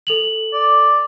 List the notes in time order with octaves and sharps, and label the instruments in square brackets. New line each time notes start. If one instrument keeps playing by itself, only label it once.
[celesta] A4 F7 F#7
[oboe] D5